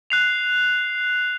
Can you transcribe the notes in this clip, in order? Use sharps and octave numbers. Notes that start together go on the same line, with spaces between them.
F#6 C7 F7